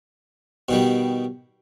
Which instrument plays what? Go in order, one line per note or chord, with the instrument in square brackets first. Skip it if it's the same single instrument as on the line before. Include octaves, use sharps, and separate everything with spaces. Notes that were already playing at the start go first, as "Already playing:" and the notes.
[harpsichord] B2 D#3 G3